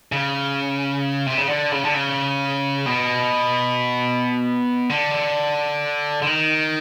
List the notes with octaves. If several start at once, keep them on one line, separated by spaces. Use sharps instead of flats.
C#3
C3
C#3
D3
C#3
D3
C#3
B2
D3
D3
D#3